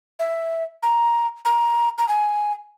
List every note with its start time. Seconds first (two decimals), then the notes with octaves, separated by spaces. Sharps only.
0.19 E5
0.83 A#5
1.45 A#5
1.98 A#5
2.08 G#5